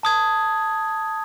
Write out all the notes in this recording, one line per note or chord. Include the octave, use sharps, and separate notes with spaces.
A5 D#6 G#6